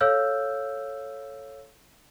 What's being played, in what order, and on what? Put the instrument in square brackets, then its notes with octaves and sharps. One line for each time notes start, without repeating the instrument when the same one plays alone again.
[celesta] A4 C#5 F5 E6 F6 G6